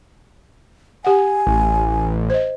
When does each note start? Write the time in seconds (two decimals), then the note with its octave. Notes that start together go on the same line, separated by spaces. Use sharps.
1.04 G4 F#5 G#5
1.47 A1
2.30 C5 D#5